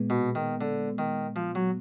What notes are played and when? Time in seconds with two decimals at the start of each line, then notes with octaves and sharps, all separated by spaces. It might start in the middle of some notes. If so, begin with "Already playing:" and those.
Already playing: A#2 G#3 B3
0.10 B2
0.35 D#3
0.61 D3
0.98 D#3
1.36 F3
1.55 F#3